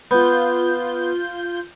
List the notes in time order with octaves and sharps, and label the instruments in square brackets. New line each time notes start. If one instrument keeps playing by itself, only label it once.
[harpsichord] B3 [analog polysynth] F4 G6